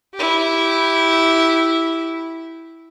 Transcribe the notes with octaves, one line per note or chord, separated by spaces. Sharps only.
E4 G4